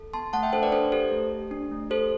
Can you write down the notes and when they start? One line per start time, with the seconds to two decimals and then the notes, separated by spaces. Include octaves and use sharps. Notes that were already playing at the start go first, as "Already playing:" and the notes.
Already playing: A4
0.13 B3 A5 C6
0.33 A3 F#5 A5
0.43 E5 G5
0.53 D4 A4 C5
0.63 B4 D5
0.72 D4 A4 C5
0.92 G4 A4 C5
1.11 A3
1.31 G4
1.51 D4
1.71 A3
1.90 G4 A4 C5